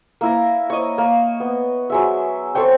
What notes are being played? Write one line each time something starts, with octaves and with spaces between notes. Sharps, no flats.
A#3 E4 A#5
C#5 D#5
A#3
B3
F#3 G#3 E5
A4 C5 C#5 G5